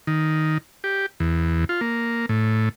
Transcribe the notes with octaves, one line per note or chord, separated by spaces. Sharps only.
D#3
G4
E2
F4
A#3
A2